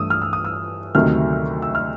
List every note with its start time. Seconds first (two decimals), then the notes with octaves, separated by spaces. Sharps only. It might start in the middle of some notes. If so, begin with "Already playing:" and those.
Already playing: G2 E3 A3 D4 D#6 E6
0.10 F6
0.22 E6
0.33 D#6
0.45 E6
0.95 D2 C3 D#3 F#3 A3 F6
1.62 E6
1.75 F6